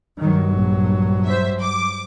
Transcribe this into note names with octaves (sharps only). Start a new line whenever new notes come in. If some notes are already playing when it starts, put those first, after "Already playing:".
G2 D#3 F#3
A#1
C5 E5
D6